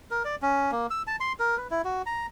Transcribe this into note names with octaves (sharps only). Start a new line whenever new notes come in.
A#4
D5
C#4
A#3
E6
A5
C6
A#4
B4
E4
F#4
A#5